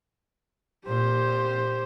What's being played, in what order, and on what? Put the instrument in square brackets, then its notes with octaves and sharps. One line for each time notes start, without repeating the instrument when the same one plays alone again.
[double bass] A#2 [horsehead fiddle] G4 C5